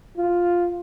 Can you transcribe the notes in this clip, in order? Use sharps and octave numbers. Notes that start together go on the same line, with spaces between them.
F4